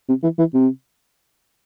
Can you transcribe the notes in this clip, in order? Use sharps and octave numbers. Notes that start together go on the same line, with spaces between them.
C3
E3
E3
C3